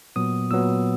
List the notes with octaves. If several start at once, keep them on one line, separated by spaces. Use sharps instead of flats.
A#2 F#3 B3 D#6
A#2 F#3 B3 E6